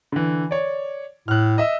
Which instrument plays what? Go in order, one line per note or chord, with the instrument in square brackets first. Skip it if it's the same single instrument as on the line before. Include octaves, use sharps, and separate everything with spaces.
[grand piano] D3 E3
C#5 D5
[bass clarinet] A2 [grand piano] F6 F#6
[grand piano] D#5 E5 E6